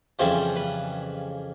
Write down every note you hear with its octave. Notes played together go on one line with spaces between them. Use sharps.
F2 C#3 E3 G3 C5
B4